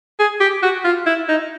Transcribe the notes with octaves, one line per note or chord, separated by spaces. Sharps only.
G#4
G4
F#4
F4
E4
D#4